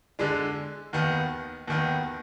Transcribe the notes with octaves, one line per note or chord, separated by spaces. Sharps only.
D3 G#3 D4
D#2 D#3 B3
D#2 D#3 B3